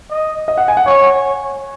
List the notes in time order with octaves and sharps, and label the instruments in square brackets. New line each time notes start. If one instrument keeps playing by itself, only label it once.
[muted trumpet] D#5
[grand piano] D#5
F#5
G#5
F#5
[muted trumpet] C#5 [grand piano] G#5